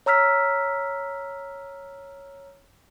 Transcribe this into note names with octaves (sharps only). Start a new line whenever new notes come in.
C#5 A#5 E6 F6 B6